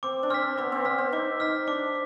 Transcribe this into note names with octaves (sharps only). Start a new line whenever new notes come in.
C4 D6
D4
C4 F6 B6
B3 D6
C4
B3 F6 B6
C4
D#4 D6
D#4 F6 B6
D4 D6